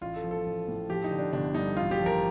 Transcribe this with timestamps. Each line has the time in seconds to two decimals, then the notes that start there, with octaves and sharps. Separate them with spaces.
0.01 A1 F4
0.16 A4
0.24 F3
0.31 A4
0.46 A1
0.68 A2
0.90 F3 G4
1.04 D#4
1.11 D3
1.19 D4
1.33 G1 D4
1.54 G2 D#4
1.77 A1 F4
1.91 G4
1.99 F3
2.06 A#4